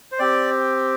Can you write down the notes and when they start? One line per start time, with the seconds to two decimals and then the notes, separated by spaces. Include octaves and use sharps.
0.12 C5
0.19 C4 G4 D5